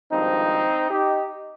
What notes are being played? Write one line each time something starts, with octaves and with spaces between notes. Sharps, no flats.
G#1 G2 F3 C4 D#4
D#4 G4